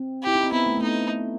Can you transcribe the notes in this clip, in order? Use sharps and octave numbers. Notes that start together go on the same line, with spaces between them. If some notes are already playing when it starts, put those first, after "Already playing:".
Already playing: C4
E4 G4
D#4
C4
B3 E4
A3
A3
B3 D#4